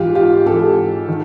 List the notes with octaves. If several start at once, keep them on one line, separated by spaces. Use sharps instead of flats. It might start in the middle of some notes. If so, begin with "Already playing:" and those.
Already playing: G#2 E3 F4 G4
F4 G4
G#2 E3 G4 A4
D#3